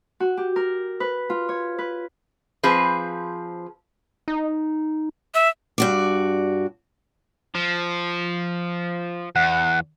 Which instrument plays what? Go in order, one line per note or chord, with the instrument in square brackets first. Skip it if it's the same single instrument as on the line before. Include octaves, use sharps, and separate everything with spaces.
[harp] F#4
G4
A#4
B4
F4
C#5
B4
[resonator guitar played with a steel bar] F3 C4 G#4 B4
[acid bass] D#4
[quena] E5
[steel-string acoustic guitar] G2 F#4 D5
[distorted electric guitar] F3
[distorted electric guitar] E2 [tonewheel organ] F#5